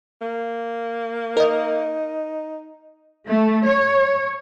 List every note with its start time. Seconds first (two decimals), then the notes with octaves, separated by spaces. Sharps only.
0.21 A#3
1.37 D#4 A#4 D#5
3.27 A3
3.65 C#5